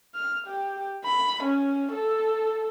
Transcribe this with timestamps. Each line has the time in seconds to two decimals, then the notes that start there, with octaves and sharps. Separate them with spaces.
0.14 F6
0.47 G4
1.05 B5
1.44 C#4
1.92 A4